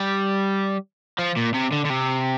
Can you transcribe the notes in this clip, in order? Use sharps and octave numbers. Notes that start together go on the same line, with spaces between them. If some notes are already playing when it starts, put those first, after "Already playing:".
Already playing: G3
F3
A#2
C3
D3
D3
C3